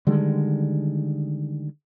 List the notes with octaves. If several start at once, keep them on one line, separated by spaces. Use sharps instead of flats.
D3 D#3 G3 G#3